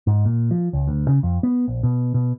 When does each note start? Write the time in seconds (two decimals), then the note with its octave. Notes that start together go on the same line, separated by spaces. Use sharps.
0.07 G#2
0.25 A#2
0.51 F3
0.73 C#2
0.88 D2
1.08 C#3
1.23 F2
1.43 B3
1.68 A#1
1.83 B2
2.14 B2